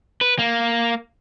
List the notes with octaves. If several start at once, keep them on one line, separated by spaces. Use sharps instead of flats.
B4
A#3